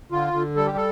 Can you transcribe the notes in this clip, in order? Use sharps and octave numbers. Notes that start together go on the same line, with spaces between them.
D3 F4
D3
G3 A4
G4
A4